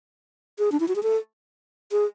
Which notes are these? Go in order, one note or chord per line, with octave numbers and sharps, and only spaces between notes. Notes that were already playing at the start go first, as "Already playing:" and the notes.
G#4
D4
E4
F#4
G#4
A4
G#4